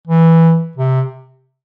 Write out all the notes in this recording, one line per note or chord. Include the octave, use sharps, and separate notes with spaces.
E3
C3